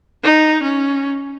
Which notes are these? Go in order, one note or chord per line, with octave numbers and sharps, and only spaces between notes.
D#4
C#4